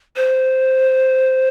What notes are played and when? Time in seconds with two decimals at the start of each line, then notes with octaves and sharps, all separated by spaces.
0.16 C5